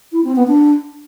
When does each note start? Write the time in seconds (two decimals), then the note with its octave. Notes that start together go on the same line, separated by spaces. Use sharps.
0.12 E4
0.24 C4
0.36 B3
0.48 D4